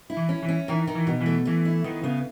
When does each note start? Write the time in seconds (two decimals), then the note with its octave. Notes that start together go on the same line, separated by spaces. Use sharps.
0.10 E4
0.17 E3
0.29 C#4
0.43 E3
0.48 C#4
0.68 D#3 E3
0.87 D#3
0.95 E3
1.07 B2
1.21 E3
1.26 A3
1.45 E3 A3
1.65 E4
1.84 D#3 B3
2.03 C#3 B3